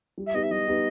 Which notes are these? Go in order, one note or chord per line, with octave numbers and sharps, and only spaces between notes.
G3
E5
B3 D#4 G4 D#5
E5
G3 D#5
B3 D#4 G4